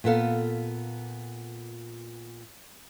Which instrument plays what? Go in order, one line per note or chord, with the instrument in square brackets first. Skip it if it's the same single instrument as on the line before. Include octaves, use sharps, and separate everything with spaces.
[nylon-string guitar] A#2 B3 A4 F5